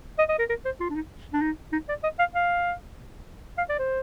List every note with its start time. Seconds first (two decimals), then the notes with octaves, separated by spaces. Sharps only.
0.18 D#5
0.29 D#5
0.39 A#4
0.49 A#4
0.65 C5
0.80 F4
0.90 D4
0.95 D#4
1.33 D4
1.41 D#4
1.72 D#4
1.89 D5
2.03 D#5
2.19 F5
2.35 F5
3.58 F5
3.69 D5
3.79 C5